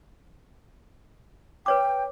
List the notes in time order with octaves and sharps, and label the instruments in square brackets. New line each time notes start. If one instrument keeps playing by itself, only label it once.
[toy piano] B4 C#5 D6 [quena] G5